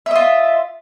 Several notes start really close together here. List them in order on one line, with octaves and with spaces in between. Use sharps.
E5 D#5 F4